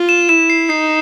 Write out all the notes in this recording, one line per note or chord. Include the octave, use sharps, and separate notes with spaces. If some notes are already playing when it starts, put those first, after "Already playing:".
Already playing: F4
E7
E4 E7
C7
D#4 C7